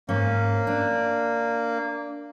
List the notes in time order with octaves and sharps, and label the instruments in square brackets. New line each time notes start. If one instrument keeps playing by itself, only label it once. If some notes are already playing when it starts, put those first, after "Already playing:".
[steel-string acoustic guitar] G#2 C#4 [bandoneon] A#3
[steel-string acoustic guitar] D4